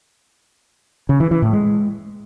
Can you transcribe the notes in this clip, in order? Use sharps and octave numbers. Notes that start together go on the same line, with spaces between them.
C#3
E3
E3
A2
G#3